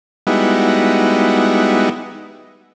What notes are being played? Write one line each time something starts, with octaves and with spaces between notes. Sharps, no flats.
G3 G#3 B3 D#4 E4 F#4